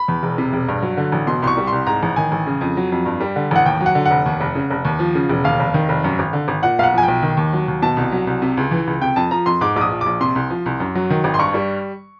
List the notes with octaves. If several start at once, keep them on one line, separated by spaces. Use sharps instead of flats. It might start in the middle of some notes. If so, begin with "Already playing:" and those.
Already playing: B5
E2
E1
C3
E1
G2
F#3
D3
A1
B2 C6
C2 C6
C#6
G3
C6
C2
G#2 A#5
A1
D#3 G#5
A1
C#3
F2
F#3
F2
G2
G3
D3
A1 F#5
D#2 G5
F#3
F#5
D3
F#5
F1
D#2
F1
C#3
F1
D#2
F3
C#3
E1
D#2 F5
F1
D#3
F1
F#2
G#1
D3
G#1
A#2 F#5
B1 F5 F#5
F3 G#5
G5
B1
D#3
D#2
F#3
D#2
B2 A5
C2
F#3
C2
C3
C#2
E3
C#2
C3 G5
F2 A5
F3 A#5
F2 C6
G#2 D6
A#1 D6
D#6
F3
A#1 D6
C3 C6
C2
F3
C2
F#2
F#3
D#3
G#1
C6
G2 C#6
G3